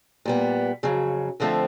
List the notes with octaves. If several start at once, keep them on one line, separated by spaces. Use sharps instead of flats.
A#2 G3 B3
F2 C#3 F#3
F2 D3 F3 A3 C4